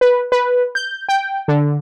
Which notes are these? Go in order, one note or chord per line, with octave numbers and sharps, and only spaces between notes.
B4
B4
G6
G5
D3